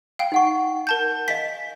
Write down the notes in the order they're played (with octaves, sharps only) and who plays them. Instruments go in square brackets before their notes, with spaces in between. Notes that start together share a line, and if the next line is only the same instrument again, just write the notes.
[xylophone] F5 G5
[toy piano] D#4 F#5 C#6
[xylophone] A#4 A5 G6
[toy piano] D#5 F5 G#5 [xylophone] B6